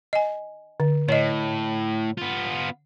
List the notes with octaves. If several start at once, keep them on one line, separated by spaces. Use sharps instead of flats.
D#5 G#5
D3
A2 C#5 D#5
B3 F4